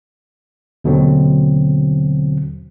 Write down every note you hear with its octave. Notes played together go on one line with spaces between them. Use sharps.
D#2 B2 D3 F#3 C4